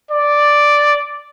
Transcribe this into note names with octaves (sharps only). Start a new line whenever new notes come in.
D5